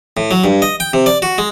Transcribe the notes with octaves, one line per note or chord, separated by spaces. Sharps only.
A2
F#3
G2
D#5
G5
C3
D5
F#4
G#3